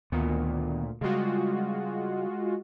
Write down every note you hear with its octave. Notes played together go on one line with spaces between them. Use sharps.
D2 A#2 D#3 B3
C#3 G3 G#3 F4 F#4